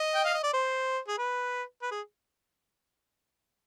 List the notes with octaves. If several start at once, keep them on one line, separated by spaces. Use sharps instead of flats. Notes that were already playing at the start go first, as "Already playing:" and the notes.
Already playing: D#5
G5
F5
D#5
D5
C5
G#4
B4
B4
G#4